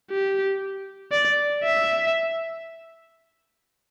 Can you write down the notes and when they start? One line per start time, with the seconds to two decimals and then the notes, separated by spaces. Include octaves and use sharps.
0.11 G4
1.12 D5
1.64 E5